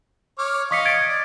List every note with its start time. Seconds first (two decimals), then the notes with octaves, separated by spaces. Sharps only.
0.38 C#5 D6 F6
0.71 D#5 F5 C#6 B6 C#7
0.85 G#6 A6 D7
1.09 D5